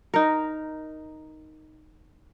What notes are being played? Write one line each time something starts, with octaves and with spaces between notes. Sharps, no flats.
D#4 A#4